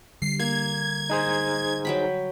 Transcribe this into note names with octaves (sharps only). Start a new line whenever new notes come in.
D3 G3 C7
A#3 G#6
D#4 G#4 C5
F#3 G5 B5